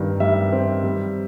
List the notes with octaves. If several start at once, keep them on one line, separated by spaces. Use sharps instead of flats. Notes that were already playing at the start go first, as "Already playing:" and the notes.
Already playing: G2 D#3
G3 E5
C4
G3